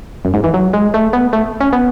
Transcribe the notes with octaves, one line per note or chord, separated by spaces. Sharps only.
F#2
G#2
E3
F#3
G#3
A3
B3
A3
C#4
B3